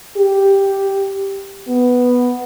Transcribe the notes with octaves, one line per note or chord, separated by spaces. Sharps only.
G4
B3